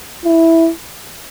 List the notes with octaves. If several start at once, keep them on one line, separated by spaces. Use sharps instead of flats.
E4